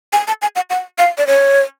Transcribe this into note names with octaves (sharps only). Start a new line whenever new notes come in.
G#5
A5
G#5
F#5
F#5
F5
D5
C#5